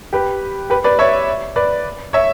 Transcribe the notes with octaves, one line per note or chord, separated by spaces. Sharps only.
G4 B4
G4 B4
B4 D5
C#5 E5
B4 D5
C#5 E5